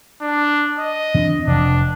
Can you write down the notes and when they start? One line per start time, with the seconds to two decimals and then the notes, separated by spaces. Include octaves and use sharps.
0.21 D4
0.79 D#5
1.14 E3 C4 D4
1.47 F1 D4